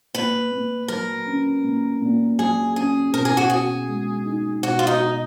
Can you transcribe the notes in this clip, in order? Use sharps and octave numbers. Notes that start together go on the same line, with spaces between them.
A#2 B4
A#2
F#3 A#4
C#4
A#2
A#2
F#3 G#4
C#4 G#4
B2 A#4
G#4
F#4
F#4 G#4
G#3
D#4
B2 F#4
F4
D#4
F#4